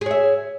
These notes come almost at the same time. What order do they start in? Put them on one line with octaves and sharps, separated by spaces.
G#4 C#5 E5